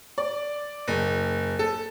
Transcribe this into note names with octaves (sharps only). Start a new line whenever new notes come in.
D5
F#1
A4